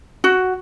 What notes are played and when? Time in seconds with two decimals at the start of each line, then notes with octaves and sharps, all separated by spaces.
0.24 F#4